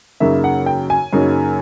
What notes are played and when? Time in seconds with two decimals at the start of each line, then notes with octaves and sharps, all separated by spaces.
0.20 F#2 C#3 F#3 A#3 D#4 E5
0.44 F#5
0.66 G5
0.90 G#5
1.13 F#2 C#3 F#3 A#3 D#4